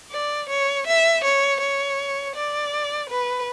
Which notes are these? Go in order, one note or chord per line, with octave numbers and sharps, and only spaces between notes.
D5
C#5
E5
C#5
C#5
D5
B4